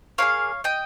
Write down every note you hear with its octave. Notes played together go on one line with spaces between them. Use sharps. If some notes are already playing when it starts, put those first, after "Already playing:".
A#3 D#4 G#4 C#5 F5
D#5 G5